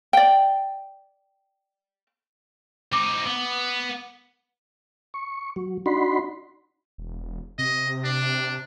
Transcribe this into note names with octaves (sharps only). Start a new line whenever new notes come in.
D5 G5
C4 D#4 D6
B3
C#6
F#3
D4 D#4 F#4 B5 C6
E1
C3 D#5
C3 D4